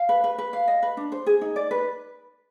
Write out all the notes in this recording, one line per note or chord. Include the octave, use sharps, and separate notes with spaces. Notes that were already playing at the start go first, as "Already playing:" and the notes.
Already playing: F5
B4
B4
B4
F5
D#5
B4
D4
C5
G#4
D#4
D5
B4